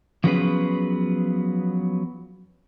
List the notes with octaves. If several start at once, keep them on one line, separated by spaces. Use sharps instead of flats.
F3 F#3 B3 C#4 G#4 B4